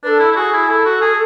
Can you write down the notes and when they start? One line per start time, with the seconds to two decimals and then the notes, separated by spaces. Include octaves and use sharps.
0.03 D4 A4 B4
0.19 E4
0.32 E4
0.36 F#4 G#4
0.53 E4
0.68 E4 A4
0.85 F#4
1.01 G#4